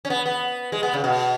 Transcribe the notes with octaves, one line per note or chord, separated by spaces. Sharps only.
C#4
B3
B3
G#3
B3
C#3
B2